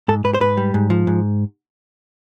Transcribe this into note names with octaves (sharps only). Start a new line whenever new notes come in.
G#2 A4
G#2 B4
C5
G#2 B4
G3
G#2
F3
G#2